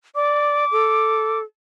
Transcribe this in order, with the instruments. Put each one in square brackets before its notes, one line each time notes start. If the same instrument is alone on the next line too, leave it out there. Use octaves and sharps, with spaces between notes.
[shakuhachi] D5 [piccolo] D6
[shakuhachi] A4